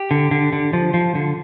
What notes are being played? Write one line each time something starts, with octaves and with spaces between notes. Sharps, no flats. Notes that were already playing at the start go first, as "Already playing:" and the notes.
Already playing: G4
D3
D3
D3
F3
F3
D3